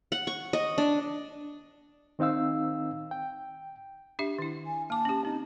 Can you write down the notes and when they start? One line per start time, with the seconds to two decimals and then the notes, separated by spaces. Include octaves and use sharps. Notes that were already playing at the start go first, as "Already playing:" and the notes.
0.12 F#5
0.27 C#6
0.53 D#5
0.78 D4
2.19 D#3 C4 D#4 F5 E6
3.11 G5
4.19 D4 G4 E5
4.38 D#3 E4
4.67 G#5
4.90 A#3 A5 D6
5.05 C#4 G4
5.25 C4 D#4